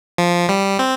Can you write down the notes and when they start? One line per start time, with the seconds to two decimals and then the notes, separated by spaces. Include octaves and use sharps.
0.18 F3
0.49 G3
0.79 C4